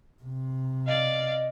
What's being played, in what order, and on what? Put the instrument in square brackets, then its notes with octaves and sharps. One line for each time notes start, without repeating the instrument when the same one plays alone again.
[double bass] C3
[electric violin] D5 F5 [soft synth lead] D#5